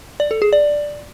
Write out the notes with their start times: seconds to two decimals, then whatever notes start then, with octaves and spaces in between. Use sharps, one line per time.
0.20 D5
0.31 A4
0.42 G#4
0.53 D5